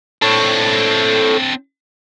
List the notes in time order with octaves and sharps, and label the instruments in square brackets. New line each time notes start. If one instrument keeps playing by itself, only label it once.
[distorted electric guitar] C4 D4 [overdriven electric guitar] A4 C#5